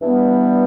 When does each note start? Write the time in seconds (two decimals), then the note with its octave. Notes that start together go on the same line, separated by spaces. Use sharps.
0.01 G2 E3 G3 B3